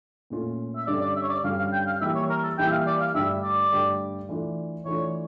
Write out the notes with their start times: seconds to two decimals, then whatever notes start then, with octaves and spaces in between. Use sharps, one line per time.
0.30 A#2 A3 C#4 F4
0.76 E5
0.87 G2 D3 G3 C#4 D5
1.01 D5
1.16 E5
1.23 C#5
1.30 D5
1.44 G2 D3 G3 C#4 F5
1.58 F5
1.73 G5
1.86 F5
2.01 E3 G3 A#3 E4 G4 E5
2.15 C#5
2.30 A#4
2.44 A4
2.58 E3 G3 A#3 E4 G4 G5
2.68 E5
2.72 F5
2.87 D5
3.00 F5
3.14 G2 D3 A3 D4 G4 E5
3.43 D5
3.72 G2 D3 A3 D4 G4
4.29 E3 A3 D4 F4
4.85 E3 A3 D4 F4 C#5